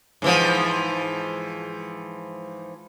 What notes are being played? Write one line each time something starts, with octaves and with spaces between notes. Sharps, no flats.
G#2 E3 F3